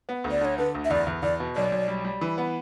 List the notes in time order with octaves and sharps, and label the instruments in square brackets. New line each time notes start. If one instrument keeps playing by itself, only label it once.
[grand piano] B3
D2
[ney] D5
[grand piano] D3 [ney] C#5
[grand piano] D3 [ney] B4
[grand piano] D2
[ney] E5
[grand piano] E2 [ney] D5
[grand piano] E2
[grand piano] E2 [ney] D5
[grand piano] B2
[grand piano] B1 [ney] D5
[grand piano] B1
G3
G3
E3
B3